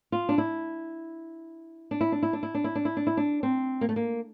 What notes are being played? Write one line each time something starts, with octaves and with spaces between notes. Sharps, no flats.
F4
D4
E4
D4
E4
D4
E4
D4
E4
D4
E4
D4
E4
D4
E4
D4
C4
A#3
A3
A#3